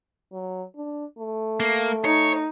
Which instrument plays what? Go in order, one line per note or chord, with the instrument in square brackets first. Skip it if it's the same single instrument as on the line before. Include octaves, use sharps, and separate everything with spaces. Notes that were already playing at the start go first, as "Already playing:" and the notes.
[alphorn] F#3
D4
A3
[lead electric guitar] A#3
[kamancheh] D#4 [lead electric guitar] C#5